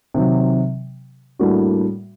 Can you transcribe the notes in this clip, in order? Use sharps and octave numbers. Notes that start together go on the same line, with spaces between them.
C3 D#3 F#3
A2 G3 A#3 D4 F#4